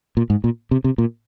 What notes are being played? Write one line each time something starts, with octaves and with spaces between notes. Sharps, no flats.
A#2
G#2
A#2
C3
C3
A#2